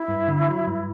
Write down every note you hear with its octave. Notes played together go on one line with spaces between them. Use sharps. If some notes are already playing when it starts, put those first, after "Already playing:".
Already playing: E4
G2
D3
F#3
G2